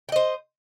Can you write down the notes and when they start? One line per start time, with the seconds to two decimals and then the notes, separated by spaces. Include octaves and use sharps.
0.09 G5
0.12 D#5
0.16 C5